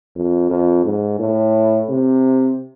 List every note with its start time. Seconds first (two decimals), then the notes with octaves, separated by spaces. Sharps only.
0.16 F2
0.50 F2
0.85 G#2
1.20 A2
1.90 C3